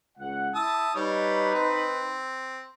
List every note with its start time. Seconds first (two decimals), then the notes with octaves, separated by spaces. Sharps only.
0.18 C#2 F#5
0.55 E4 A5 D#6 E6
0.95 G3 D#4 B4 C#5
1.54 C4